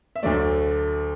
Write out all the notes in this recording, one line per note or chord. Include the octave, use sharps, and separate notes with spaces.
E5
D2 D3 F#3 A3 D5